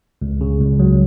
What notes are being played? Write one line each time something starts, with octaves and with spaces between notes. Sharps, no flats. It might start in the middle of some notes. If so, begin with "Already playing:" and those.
C#2
C#3
C#2
F#3